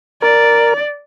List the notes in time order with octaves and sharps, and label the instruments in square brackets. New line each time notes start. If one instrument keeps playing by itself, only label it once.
[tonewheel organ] A#4 [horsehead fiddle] D5